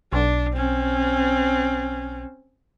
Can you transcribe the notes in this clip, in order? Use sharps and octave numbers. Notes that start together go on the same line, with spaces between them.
B1 D4
C4 C#4